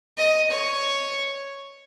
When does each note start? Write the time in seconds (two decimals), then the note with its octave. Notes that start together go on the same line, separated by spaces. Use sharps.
0.18 D#5
0.50 C#5